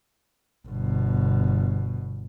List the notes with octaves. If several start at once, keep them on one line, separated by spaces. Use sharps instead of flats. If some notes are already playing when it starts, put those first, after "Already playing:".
G1 B2